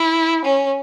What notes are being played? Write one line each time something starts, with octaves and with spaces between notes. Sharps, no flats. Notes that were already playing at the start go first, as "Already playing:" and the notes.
Already playing: E4
C#4